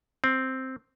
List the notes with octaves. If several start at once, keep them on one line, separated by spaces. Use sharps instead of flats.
C4